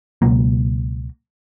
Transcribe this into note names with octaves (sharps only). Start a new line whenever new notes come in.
C#2 B2 F#3 A#3